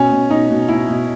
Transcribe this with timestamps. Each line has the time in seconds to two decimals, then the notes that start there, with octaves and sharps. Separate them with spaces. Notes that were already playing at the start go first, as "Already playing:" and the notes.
Already playing: B2 C#4
0.11 B2
0.30 B2 D#4
0.50 B2
0.69 B2 E4
0.89 B2